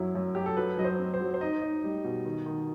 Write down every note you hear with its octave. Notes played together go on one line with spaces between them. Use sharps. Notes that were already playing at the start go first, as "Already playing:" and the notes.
Already playing: F#2 F#3 E4
F#2
F#2 G4
A4
F#3 B4
F#3 D#5
C5
C4
C5
F#3
C5
D#4 D#5
D#4
G3
B2
D#3
D#3